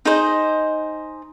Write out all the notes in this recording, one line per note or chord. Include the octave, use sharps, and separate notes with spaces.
D#4 G#4 C5 D#5